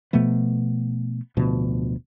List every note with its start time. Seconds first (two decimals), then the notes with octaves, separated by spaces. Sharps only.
0.13 B2 F3 A3 B3
1.37 D1 D2 B2 F3